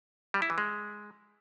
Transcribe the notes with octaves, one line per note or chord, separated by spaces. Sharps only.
G3
E4
E3
G#3